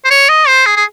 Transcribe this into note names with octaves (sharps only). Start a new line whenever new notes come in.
C5
C#5
D#5
C5
G#4
G#4